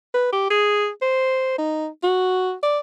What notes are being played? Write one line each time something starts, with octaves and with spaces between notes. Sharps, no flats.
B4
G4
G#4
C5
D#4
F#4
D5